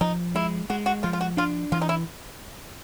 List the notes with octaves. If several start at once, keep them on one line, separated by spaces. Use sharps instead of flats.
F3 D#4
G#3 E4
G#3 F#4
F#4
F3 F4
F4
F#4
D4 F4
E3 F4
D#4
E4